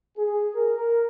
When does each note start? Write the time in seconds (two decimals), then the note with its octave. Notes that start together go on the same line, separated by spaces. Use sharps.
0.17 G#4
0.55 A#4